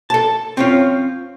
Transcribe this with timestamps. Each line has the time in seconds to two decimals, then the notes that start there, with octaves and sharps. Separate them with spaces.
0.10 A4 A5
0.57 C4 C#4 F4